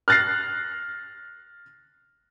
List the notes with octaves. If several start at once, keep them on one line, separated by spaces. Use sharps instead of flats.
F6 F#6 A6 A#6 C7